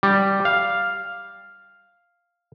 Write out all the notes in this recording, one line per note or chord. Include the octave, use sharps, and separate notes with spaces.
G3
F5